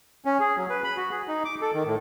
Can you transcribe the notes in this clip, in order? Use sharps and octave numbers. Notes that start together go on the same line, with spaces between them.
C#4
G#4
F#3
B4
B5
F#4
G#4
D#4
D6
A4
D#3
A2